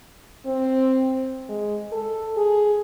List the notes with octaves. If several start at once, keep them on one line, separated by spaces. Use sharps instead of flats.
C4
G#3
A4
G#4